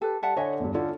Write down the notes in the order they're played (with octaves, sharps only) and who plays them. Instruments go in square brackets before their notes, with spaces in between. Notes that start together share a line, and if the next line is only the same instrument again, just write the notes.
[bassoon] G4 [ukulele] A4 B4
[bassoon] G3 [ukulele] E5 F#5 A5
[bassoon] D3 [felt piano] C#5 F#5 G#5 [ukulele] D#5 E5
[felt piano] E2 G2
[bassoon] D3 [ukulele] C#4 [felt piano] F4 A4